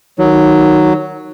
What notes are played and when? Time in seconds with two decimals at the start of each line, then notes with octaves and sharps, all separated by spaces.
0.19 D#3 F#3